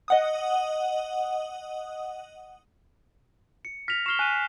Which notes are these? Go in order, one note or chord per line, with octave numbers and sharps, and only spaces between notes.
D#5 F#5 D#6
C#7
F6 A#6 B6 F7
C#6 F6 C7 E7 G7
G#5 F#6 D#7